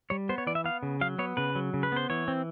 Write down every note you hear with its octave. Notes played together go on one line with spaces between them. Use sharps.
G3 C#5
B3 C5
C#5
E3 D5
E5
B3 F5
C#3
F#3 F5
B3 C#5
C#3 B4
F#3
C#3
B4
B3 C5
E3 C#5
C4